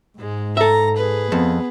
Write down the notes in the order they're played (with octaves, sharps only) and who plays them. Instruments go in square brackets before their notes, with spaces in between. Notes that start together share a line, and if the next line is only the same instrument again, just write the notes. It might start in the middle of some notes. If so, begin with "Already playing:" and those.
[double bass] G#2 [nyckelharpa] G#3
[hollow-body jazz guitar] A4 E5 [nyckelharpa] A#5
[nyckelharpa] G#4 B4
[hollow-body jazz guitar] F2 [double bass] B3